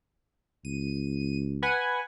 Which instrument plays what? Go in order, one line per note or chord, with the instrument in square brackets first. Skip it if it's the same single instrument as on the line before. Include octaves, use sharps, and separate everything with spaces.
[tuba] C#2 [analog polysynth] D#7
[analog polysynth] B4 F#5 G#5